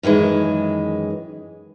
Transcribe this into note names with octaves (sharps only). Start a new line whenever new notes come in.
F#2 D#3 E3 G#3